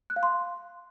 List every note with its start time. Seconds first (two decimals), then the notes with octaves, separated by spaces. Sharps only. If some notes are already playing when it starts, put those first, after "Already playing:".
0.10 F#6
0.16 F5
0.23 C6